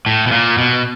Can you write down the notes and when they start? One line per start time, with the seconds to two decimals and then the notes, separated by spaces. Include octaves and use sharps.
0.06 A2
0.27 B2
0.32 A#2
0.58 B2